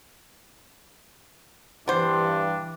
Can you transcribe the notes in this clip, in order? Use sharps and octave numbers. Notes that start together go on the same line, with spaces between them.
G2 E3 B3 D4 C5